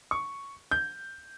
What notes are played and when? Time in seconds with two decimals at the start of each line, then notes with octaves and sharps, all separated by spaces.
0.11 C#6
0.71 G6